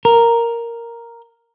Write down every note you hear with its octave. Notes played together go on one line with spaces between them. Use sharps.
A#4